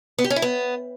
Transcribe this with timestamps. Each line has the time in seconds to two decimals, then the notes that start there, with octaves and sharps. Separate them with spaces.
0.18 B3
0.24 G4
0.30 C#4
0.36 E4
0.42 B3